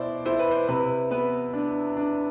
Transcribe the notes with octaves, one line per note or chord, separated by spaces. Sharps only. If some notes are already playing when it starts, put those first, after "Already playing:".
Already playing: B2 E4 C5 D5
E4 C5
B4
C5
C3 B4
B3 B4
D4
D4